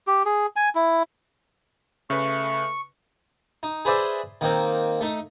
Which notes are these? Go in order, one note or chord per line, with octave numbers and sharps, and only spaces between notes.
G4
G#4
G#5
E4
C#3 A3 B4 C#6
D#4
G#4 B4 C5 D5 E5
D#3 A#3 C4
A3 D#4